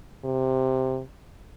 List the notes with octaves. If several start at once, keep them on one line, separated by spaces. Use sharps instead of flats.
C3